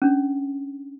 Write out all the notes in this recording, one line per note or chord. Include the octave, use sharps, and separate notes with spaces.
C#4 D4